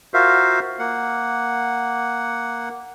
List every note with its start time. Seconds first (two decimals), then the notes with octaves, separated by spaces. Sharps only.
0.14 F4 F#4 A#4 C5 E5 F5
0.79 A#3 F#5